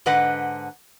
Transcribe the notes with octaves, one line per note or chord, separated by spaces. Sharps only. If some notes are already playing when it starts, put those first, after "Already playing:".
G#2 D3 B4 D#5 F#5